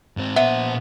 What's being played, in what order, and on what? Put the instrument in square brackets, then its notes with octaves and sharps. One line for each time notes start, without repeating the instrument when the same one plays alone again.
[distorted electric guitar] G#2 C4
[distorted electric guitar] A#2 C5 [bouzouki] B3 [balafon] E5